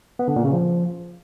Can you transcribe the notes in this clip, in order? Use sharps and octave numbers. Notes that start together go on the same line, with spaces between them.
B3
D3
A#2
C#3
F3